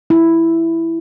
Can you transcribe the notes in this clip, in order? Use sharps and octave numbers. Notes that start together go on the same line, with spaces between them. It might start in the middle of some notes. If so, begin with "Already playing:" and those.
E4